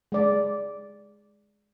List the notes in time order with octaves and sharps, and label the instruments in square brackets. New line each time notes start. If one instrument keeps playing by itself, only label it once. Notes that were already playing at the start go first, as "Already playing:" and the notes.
[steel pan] G#3 D5